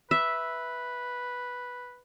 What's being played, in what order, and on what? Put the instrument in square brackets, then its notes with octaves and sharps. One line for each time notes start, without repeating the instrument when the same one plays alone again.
[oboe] B4 [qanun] E5